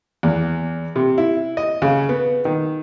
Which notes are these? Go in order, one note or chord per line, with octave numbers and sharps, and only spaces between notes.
E2
C3
E4
D#5
C#3
B3
D#3